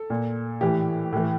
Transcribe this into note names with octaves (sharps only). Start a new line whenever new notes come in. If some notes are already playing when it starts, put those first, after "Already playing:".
Already playing: A4
A#2
A2 E3 G4
A2 E3